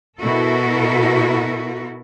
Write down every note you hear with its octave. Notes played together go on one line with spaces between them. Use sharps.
B2 B3 E4 F#4 A4 A#4